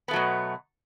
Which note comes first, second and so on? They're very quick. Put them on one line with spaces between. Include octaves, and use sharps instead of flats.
B3 A3 F#3 B2